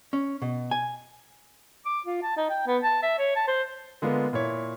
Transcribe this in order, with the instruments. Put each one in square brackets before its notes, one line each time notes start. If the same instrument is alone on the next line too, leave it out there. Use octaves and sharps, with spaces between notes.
[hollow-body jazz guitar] C#4
B2
G#5
[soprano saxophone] D6
F4
A5
D#4
G5
B3
A5
E5
C#5
A5
C5
[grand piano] D3 G#3 A#3 B3 F4
A#2 E4 C#5